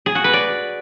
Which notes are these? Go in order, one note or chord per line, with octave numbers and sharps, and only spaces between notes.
G#4
F#4
B4
D5